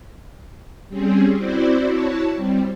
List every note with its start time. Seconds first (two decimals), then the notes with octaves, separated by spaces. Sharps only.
0.88 G3 C4 C#4 G#4
1.36 C4 E4 F#4 C5 D5
1.89 E4 F#4 C#5 A5
2.36 G3 C4